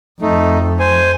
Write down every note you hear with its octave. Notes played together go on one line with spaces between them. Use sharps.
F2 A3 D#4
C5 G#5